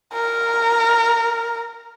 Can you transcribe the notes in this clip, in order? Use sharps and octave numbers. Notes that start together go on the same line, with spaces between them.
A#4